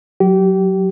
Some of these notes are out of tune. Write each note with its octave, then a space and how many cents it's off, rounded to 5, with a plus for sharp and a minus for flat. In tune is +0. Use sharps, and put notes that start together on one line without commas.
F#3 +0 G4 -30